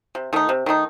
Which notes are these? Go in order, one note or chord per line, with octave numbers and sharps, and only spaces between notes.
C3
D#3 A3 D#4
C3
D#3 A3 D#4